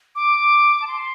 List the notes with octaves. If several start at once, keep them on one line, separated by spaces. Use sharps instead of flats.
D6
A5
C6